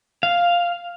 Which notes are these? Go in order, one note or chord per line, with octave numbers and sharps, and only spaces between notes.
F5